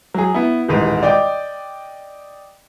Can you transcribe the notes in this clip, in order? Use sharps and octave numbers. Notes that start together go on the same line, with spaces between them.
F#3 G#4
B3 E4
D#1 A1 G#2 B4
D5 D#5 G5 D6